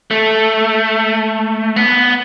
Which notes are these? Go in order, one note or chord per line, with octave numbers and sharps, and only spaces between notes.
A3
B3